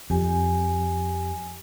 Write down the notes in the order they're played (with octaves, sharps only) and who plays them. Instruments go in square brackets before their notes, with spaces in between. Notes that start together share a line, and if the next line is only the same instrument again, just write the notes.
[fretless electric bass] F2 [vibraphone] G4 G#5